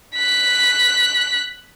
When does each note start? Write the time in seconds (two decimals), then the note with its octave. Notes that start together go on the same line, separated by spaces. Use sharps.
0.16 F#6 B6